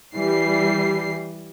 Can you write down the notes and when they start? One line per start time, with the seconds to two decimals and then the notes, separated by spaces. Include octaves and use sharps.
0.14 E3 G3 C7